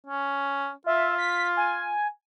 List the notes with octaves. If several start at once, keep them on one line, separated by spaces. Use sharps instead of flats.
C#4
F4 E5
B6
G#5